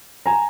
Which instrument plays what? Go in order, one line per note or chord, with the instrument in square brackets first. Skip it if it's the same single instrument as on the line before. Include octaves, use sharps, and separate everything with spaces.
[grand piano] G#5 A#5